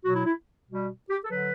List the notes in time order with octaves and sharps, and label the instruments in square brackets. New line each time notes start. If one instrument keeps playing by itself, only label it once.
[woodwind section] B2 F#3 F#4
E4
E4
B2 G3
G4
A4
D3 F#3 B4